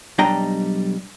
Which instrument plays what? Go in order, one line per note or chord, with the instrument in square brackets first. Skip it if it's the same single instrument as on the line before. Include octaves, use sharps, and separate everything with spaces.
[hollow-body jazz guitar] B1 G3 D4 D#5 G5 A#5